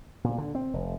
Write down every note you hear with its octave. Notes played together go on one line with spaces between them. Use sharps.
A#2
D3
C4
F1